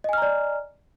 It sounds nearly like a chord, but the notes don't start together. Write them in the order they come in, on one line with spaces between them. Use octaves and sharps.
D#5 G#5 F6 A#5 D5